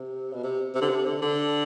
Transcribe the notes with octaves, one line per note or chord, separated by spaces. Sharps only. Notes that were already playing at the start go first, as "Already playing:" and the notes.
Already playing: C3
B2
C3
C3
D3
C3
D3
D3